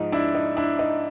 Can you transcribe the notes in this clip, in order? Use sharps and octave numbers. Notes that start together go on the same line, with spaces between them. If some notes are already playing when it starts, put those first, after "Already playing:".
Already playing: G#2 F3 D#4
D4 E4
D#4
D4 E4
D#4